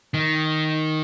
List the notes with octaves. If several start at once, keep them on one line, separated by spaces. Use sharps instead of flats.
D#3